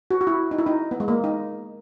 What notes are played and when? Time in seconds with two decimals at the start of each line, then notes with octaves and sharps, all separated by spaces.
0.11 F#4
0.21 F#4
0.27 E4
0.51 D#4
0.58 E4
0.66 D#4
0.91 B3
1.00 G#3
1.08 A#3
1.24 D#4